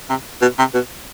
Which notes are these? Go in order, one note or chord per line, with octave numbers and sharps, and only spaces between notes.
C3
B2
C3
B2